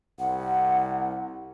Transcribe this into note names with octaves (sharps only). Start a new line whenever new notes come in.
C2 F#5